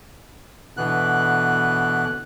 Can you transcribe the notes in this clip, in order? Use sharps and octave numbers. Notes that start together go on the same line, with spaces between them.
B2 D3 E3 B3 F#6